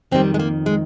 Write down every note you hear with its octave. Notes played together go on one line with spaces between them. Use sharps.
F2 D#3 G3 C4
G#3
A#3
G#3